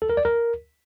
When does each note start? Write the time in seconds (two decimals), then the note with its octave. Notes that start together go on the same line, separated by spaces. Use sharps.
0.02 A4
0.10 A#4
0.17 D5
0.25 A#4